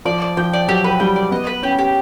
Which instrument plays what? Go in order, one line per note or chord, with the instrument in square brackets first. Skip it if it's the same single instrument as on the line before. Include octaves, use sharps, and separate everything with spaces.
[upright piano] F3 [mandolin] D5
[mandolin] D5
[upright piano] F3 [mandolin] G5
[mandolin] D5
[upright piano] F#3 [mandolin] G4
[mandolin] B4
[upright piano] G3 [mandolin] G5
[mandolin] D5
[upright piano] B3 [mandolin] D#5
[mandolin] B4
[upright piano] C#4 [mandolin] G4
[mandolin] G4